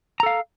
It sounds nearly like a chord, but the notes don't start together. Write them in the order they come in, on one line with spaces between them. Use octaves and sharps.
A#5 A4 F5